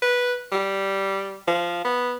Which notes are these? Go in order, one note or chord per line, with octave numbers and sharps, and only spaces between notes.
B4
G3
F3
B3